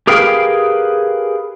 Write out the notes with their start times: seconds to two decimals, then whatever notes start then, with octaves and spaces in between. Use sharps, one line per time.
0.07 G4 G#4 A#4 B4 F5 G5